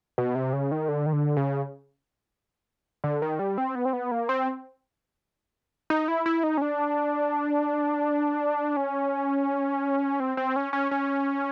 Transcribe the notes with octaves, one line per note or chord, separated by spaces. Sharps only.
B2
C3
C#3
D#3
D3
D#3
D3
C#3
D3
D#3
G3
C4
B3
C4
B3
A#3
C4
D#4
E4
E4
D#4
C#4
D4
C#4
C4
C4
C#4
C#4
C#4